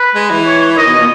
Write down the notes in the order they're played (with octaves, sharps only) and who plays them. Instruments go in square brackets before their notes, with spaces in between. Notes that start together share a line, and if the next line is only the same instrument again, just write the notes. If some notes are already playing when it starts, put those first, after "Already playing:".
Already playing: [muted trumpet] B4
[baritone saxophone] G#3
E3
[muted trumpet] C#5
[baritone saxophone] D#3 [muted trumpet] D#5
[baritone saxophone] B2
A#2